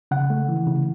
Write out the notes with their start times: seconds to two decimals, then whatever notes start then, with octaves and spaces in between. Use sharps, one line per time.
0.11 C#3 F#5
0.30 A3
0.49 E3
0.66 C#3